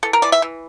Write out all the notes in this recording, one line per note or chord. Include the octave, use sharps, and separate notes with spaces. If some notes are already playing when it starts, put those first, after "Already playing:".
E3 A4
A#4
E3 D5
E5
E3